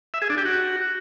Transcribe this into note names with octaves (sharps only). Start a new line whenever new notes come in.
E5
G#4
D4
G4
F#4